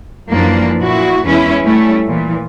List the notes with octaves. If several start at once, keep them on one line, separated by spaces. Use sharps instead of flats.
F#2 E3 F3 A#3 D4
A#2 E4 F#4
E2 G#3 C#4 E4 B4
G3 A3 C#4 E4
A#2 E3